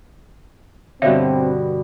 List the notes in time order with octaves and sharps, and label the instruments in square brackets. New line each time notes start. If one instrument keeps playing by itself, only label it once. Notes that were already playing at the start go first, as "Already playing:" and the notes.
[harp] G2 B2 D3 [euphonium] C4 [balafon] C#5 E5 F5